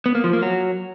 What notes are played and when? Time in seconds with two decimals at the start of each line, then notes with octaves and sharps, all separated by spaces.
0.06 B3
0.15 A#3
0.24 F3
0.33 A#3
0.42 F#3